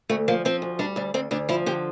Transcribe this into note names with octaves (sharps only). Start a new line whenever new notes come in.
D2 A3
F3 A#3
F3 C4
D2
G3 D4
D2 D4
D2 C4
D2 D4
F3 E4
D3 G4